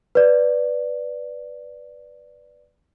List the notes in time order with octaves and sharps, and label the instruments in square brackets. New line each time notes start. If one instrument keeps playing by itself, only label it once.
[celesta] B4 D5